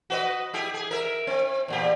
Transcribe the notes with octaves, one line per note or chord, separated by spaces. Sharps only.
F#4 B4 D#5
E4 G4 G#4
G#4
A#4 E5
C4
E2 A#2 G4